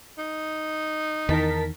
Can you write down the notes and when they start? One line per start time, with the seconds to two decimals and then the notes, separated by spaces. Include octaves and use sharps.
0.18 D#4
1.29 E2 D#3 A#4 A5 B6